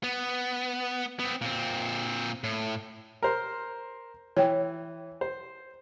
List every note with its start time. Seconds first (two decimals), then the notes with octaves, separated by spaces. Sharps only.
0.04 B3
1.19 B3 C4
1.41 A#2 C4
2.44 A2
3.23 A#4 C5 C6
4.37 E3 C#5 G5
5.21 C5